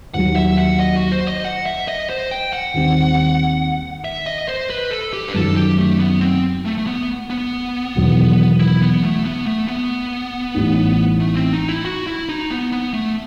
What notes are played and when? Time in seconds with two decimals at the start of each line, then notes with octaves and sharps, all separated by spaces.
0.14 D#2 D#3 F#3 F#5
0.36 E5
0.58 F#5
0.80 D#5
0.96 F#4
1.12 C5
1.28 D#5
1.45 F#5
1.66 E5
1.88 D#5
2.10 C5
2.31 G5
2.53 F#5
2.74 D#2 D#3 G3 C4
4.04 E5
4.26 D#5
4.48 C5
4.70 B4
4.91 A4
5.13 G4
5.28 B4
5.34 F#2 D#3 F#3 A4
5.56 G4
5.78 A3
6.00 B3
6.21 C4
6.65 A3
6.78 A3
6.87 B3
7.30 B3
7.95 E1 E2 D#3 F#3
8.60 E4
8.82 B3
9.03 A3
9.25 B3
9.46 A3
9.68 B3
10.54 A1 A2 G3 D#4
11.20 A3
11.36 C4
11.53 D#4
11.69 E4
11.85 F#4
12.07 E4
12.29 D#4
12.51 B3
12.72 B3
12.93 A3